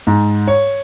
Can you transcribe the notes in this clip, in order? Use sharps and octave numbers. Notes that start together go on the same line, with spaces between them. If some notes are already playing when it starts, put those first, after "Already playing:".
G#2
C#5